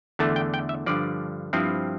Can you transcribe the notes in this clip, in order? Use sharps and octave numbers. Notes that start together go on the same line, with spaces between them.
E2 D3 A3 A5
G5
G5
E5
G2 D3 F3 D5
G2 F3 C4 E4